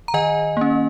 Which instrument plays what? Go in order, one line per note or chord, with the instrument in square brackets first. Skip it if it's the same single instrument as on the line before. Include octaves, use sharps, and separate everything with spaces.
[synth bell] A#5
D#3 D#5 G#5
A#3 C#4